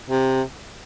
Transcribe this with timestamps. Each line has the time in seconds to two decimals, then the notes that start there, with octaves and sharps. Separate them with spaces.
0.10 C3